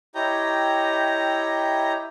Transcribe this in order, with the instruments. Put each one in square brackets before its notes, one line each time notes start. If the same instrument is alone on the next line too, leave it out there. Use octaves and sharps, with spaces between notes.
[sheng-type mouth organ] E4 G4 C#5 D#5 G5 A#5